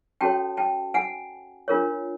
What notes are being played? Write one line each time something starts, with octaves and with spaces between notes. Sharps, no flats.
C#4 F#4 A4 C#5 G5 A5
G5 A5
F#5 G#5
D4 F4 A#4 C#5